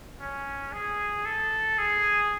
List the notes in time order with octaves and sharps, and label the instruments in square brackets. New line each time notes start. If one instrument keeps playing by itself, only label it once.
[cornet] C#4
G#4
A4
G#4